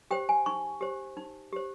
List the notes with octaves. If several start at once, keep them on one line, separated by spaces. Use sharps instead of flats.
G4 C5 G5
G#5
D#4 C#6
G4 C5
D#4
G4 C5